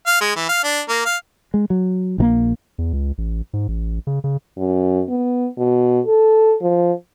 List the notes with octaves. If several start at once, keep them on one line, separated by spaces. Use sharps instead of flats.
F5
G#3
E3
F5
D4
A#3
F5
G#3
F#3
A#1 E3 A#3
E2
C#2
A1
G#2
A1
C#3
C#3
F#2
B3
B2
A4
F3